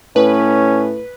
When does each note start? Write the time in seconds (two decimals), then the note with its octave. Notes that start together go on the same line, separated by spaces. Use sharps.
0.16 A2 C#4 B4